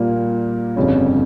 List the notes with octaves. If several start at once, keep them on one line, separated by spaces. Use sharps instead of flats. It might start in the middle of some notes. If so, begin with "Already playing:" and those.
Already playing: A#2 G3 A#3
G1 F2 C#3 G3 C#4